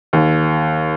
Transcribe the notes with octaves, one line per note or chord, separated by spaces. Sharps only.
D#2